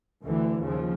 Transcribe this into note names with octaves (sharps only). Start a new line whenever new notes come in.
D2 D3 E3
D#2 C#3 F3